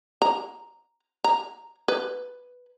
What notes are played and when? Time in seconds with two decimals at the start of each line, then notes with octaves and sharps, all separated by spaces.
0.22 A#5
1.24 A#5
1.88 B4